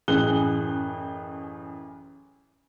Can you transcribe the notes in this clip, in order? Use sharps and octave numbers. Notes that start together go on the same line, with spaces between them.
A1 F#2 E3 G#4 F#6 G7